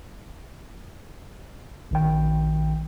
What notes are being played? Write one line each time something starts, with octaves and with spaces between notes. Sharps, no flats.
A#1 D#3 G5